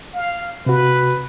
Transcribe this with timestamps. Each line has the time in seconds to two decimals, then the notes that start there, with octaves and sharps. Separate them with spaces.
0.13 F5
0.66 C3 F#4 B4